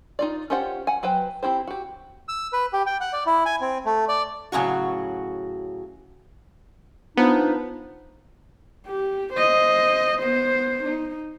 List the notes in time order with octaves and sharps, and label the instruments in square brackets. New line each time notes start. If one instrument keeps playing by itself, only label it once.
[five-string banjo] D#4 F4 D5
C#4 F4 G4 C5 F#5
F#5 G#5
F#3 B4 C5 G5
C4 E4 G4 C5
F#4 G4
[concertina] E6
B4
G4
G5
F#5
D5
E4
G#5
C4
A3
D5
[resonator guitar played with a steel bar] A2 C#3 F#3 F#4
[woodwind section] F3 D4 D#4 [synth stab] B3
[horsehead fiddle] G4
C5 D#5
B3 C5
D#4